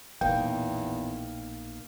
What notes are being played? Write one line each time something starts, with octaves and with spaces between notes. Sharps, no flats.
A#1 E2 B2 A#3 D#4 G5